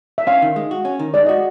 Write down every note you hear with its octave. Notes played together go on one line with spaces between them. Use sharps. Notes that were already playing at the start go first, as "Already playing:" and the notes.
E5
C#4 F5
D#3
G#3
F#4
C#4
D#3
G#3 D5
F#4 D#5